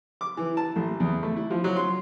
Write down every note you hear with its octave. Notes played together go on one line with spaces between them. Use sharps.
D6
E3
A5
A1
E2
A3
E4
F3
F#3
C6